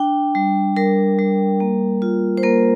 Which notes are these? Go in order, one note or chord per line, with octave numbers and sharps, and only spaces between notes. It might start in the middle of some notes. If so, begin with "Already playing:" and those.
Already playing: D4 G5
G3
G3 A#4
G3
A#3
F4
C5
A#3 A#4